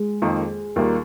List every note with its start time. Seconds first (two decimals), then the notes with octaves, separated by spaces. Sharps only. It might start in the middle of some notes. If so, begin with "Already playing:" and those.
Already playing: G#3
0.22 F2 D#3 A#3
0.76 D#2 D#3 G3 A#3 F4